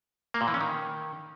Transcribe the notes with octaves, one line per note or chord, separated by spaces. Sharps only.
A#3
A#2
E3
C#4
D#3